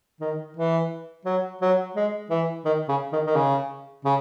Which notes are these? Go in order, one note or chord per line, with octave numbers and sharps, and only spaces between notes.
D#3
E3
F#3
F#3
G#3
E3
D#3
C#3
D#3
D#3
C#3
C#3